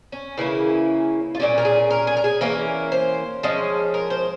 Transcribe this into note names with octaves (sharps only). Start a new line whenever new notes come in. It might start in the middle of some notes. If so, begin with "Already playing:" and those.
C#4
C#3 E3 A#3 C#4 E4
F4
A#2 G3 C#4 G4
A#4
G#4
A#4
G#4
A#4
G#4
E3 A#3 C#4 A#4
C5
F3 G#3 C#4
A#4
C5